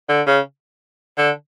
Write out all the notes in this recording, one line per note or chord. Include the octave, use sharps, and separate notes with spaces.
D3
C#3
D3